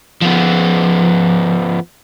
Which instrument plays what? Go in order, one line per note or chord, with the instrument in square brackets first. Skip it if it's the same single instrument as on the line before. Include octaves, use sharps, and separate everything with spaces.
[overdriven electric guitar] F3 B3